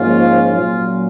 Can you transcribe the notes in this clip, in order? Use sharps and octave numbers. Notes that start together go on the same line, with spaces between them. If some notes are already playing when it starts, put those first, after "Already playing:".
Already playing: G#2 F3 A#3 C#4 F4
A#2 F#3 C#4 F4